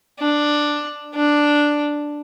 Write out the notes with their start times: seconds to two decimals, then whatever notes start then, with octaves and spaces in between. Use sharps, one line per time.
0.19 D4
1.15 D4